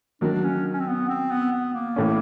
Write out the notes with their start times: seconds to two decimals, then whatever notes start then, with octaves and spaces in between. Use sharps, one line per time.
0.21 D#3 F#3 A#3 D4
0.44 C#4
0.73 C#4
0.80 C4
0.88 B3
1.09 C4
1.31 B3
1.53 B3
1.74 A#3
1.96 A2 E3 A3 C#4